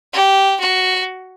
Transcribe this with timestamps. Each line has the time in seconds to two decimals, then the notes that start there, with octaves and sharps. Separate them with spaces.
0.13 G4
0.60 F#4